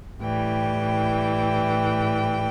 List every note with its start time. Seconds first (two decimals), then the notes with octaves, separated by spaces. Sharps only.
0.20 A2 E3 G3 G5